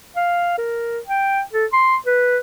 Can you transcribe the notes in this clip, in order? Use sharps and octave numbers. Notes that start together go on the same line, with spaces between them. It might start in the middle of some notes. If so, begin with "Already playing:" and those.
F5
A#4
G5
A4
C6
B4